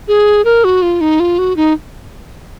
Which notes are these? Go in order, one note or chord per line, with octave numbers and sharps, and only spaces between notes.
G#4
A#4
F#4
F4
D#4
F4
F#4
D#4